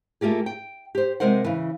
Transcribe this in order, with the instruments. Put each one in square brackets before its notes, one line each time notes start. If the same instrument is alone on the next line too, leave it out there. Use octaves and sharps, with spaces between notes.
[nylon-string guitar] A3 A#3 F4 G4 G#4
G5
G4 C5
C3 F#3 G#3 A#4 C5 F#5
C#3 E3